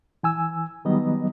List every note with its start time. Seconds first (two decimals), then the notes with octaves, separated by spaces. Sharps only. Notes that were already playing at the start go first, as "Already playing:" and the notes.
0.23 E3 G#5 E6
0.85 D#3 F#3 G3 B3 D#5